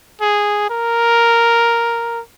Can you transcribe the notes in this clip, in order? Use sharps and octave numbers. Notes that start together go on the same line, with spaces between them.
G#4
A#4